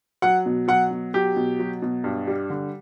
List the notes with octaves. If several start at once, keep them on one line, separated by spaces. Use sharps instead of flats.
F#3 F#5
B2
F#3 F#5
B2
F#3 G4
B2
F#3
B2
G2
G3
D3